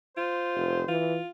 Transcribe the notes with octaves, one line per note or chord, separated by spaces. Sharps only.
F4 C5
F1
E3 F4